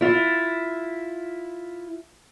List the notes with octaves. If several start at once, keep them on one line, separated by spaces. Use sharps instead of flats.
E4 F4